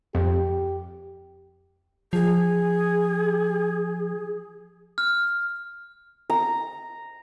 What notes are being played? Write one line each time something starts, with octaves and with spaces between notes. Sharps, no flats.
F2 G4
F3 G#4
F6
A#5